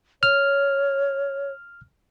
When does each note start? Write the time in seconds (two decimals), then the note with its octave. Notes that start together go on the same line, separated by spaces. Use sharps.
0.23 C#5 F6